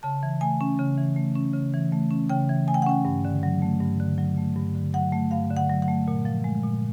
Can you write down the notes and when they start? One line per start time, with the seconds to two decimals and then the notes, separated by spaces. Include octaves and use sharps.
0.03 C#3 A5
0.23 E3
0.41 A3 G#5
0.61 C#4
0.79 C#3
0.98 E3
1.16 A3
1.36 C#4
1.54 C#3
1.74 E3
1.92 A3
2.11 C#4
2.30 C#3 G5
2.49 E3
2.67 A3 G#5
2.74 G5
2.82 F#5
2.87 C#4 G5
3.05 G2
3.25 D3
3.43 F#3
3.62 A3
3.80 G2
4.00 D3
4.18 F#3
4.38 A3
4.56 G2
4.75 D3
4.94 F#3 F#5
5.12 A3
5.31 G2 F5
5.50 D3
5.57 F#5
5.70 F#3
5.82 F#5
5.88 A3
6.08 A#2
6.25 F3
6.44 G#3
6.64 A#2